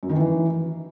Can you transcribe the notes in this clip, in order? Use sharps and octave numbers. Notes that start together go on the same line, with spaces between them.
F#2
D#3
E3